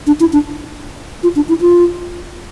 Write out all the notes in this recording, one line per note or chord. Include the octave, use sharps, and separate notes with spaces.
D4
E4
D4
F4
D4
E4
F4